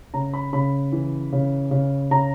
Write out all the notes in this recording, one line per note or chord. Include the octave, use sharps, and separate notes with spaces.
C#3 A#5
B5
C#3 B5
E3
C#3
C#3
C#3 A#5